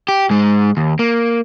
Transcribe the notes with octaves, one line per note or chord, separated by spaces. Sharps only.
G4
G#2 G#3
D#2
A#3